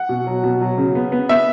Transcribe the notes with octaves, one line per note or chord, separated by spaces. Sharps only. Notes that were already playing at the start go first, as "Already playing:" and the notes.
Already playing: F#5
B2
F#3
B2
F#3
C#3
B3
B3
B3 E5